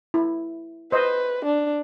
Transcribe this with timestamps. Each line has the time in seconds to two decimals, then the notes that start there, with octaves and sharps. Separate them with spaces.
0.14 E4
0.92 B4 C5 D#5
1.45 D4